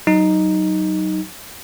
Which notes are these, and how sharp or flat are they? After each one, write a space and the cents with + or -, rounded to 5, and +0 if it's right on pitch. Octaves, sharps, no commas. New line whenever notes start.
F#3 +25 D#4 +0